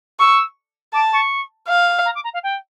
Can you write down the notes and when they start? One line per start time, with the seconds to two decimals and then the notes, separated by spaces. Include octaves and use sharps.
0.19 C#6 E6
0.93 A5 D6
1.13 C#6
1.68 F5
2.05 A#5
2.15 D6
2.24 A#5
2.33 F5
2.43 G5